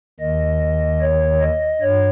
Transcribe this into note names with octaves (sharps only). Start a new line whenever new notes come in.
D#2 D#3 D#5
C#5
D#5
G2 C#5